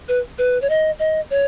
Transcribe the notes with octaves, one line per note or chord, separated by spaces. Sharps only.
B4
B4
C#5
D#5
D#5
C#5